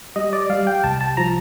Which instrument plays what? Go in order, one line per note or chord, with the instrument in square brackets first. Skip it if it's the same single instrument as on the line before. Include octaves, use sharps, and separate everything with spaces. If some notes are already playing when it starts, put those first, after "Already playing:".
[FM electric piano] G3 D#5
D5
G3 F5
G5
C2 A5
A5
F3 A#5